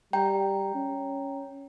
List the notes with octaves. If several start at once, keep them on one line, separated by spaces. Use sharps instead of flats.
G3 G5 A#5
C#4